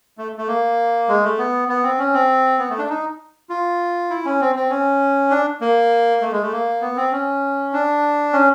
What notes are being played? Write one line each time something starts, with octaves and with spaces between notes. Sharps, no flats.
A3
A3
A#3
G#3
A3
B3
B3
C4
C#4
C4
B3
A3
D4
D#4
F4
E4
C#4
C4
C4
C#4
D4
A#3
A3
G#3
A3
A#3
B3
C4
C#4
D4
C#4